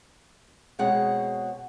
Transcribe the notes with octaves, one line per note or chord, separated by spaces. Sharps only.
B2 G#3 C4 G#4 C#5 F#5